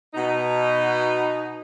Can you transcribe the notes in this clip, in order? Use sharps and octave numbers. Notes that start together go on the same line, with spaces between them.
B2 D#4